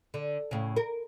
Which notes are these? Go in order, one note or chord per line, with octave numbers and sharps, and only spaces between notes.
D3
A2 C#3
A#4